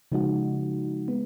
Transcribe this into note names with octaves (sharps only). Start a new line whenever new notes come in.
C#3 F3 G#3 D#4 F#4
G#3 B3